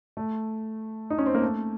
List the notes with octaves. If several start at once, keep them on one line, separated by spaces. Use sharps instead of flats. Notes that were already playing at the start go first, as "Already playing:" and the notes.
A3
D#4
C#4
C4
A#3
A3